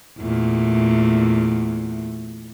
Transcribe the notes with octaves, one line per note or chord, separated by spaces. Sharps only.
E2 A#2 A3